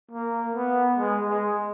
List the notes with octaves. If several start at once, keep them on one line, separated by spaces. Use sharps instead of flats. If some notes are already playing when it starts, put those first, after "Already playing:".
A#3
B3
G#3
G#3